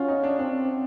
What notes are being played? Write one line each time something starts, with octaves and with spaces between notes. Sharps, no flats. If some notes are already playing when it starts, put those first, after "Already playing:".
Already playing: C#4 F4 F#4
D#4
D4
C4 D4